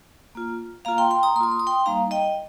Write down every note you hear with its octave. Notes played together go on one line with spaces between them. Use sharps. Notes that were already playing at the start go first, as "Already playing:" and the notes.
A#3 F4
A#3 F4 F5 A#5
G5 C6
G5 C6
A#5 D#6
A#3 C6
F4 D#6
C6
D#6
G5 C6
G3 A#3 D#4 F5 A#5
D#5 G5